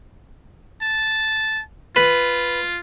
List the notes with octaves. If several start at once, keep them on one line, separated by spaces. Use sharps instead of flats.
A5
F4 B4